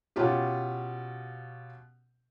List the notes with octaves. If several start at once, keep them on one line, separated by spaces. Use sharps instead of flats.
B2 C#4 F4 G4